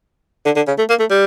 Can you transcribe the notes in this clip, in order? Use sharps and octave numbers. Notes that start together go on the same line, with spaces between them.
D3
D3
C#3
A3
A#3
A3
G3